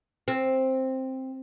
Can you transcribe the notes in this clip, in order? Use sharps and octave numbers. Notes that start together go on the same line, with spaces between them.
C4